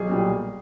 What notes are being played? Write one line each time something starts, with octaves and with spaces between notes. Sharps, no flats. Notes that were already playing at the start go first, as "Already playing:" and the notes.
Already playing: B1 G#4
A#2 G3